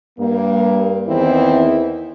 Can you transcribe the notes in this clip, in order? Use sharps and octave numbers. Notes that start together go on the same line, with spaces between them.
G2 A#3
E2 D#3 E3 C4 E4